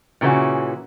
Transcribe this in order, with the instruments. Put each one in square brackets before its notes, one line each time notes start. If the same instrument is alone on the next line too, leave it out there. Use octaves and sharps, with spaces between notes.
[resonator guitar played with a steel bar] A#2 C#3 E3 C#4 F#4